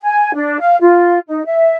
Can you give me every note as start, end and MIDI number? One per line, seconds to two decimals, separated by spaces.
0.01 0.32 80
0.34 0.59 62
0.59 0.76 77
0.81 1.19 65
1.28 1.42 63
1.46 1.76 76